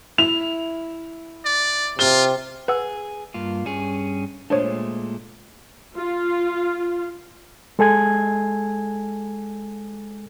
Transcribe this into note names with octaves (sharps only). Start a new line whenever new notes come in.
E4 F7
D5
C3 F4 G7
G#4 B4 F#5 E6
G2 A#3 F4
G2 C#4 G#4
A#2 G#3 A3 D4 C5 C#5
F4
G#3 A4 G#5 G#6